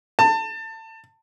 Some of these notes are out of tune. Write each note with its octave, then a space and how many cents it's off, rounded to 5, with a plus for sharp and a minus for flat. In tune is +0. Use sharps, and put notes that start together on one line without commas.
A5 +25